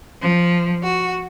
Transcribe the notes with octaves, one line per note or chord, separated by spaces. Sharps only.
F3
F#4